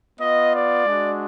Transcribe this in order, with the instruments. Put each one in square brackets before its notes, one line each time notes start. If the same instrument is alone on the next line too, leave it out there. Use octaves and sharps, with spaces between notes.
[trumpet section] B3 F4 D#5
D5
G#3 D4 F#4